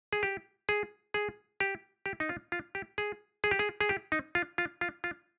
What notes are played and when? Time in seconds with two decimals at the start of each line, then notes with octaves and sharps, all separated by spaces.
0.13 G#4
0.23 G4
0.69 G#4
1.14 G#4
1.60 G4
2.06 G4
2.20 D#4
2.29 F4
2.52 F4
2.75 G4
2.98 G#4
3.44 G#4
3.51 G4
3.59 G#4
3.81 G#4
3.89 G4
4.12 D#4
4.35 F4
4.58 F4
4.81 F4
5.04 F4